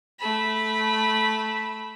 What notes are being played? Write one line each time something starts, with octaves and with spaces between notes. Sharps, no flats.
A3 B5